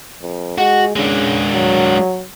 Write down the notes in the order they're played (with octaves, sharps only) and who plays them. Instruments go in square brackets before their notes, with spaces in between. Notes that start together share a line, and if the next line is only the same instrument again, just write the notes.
[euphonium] F2
[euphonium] G#3 [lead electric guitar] F#4
[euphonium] C#3 [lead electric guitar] G#3 D4
[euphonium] F#3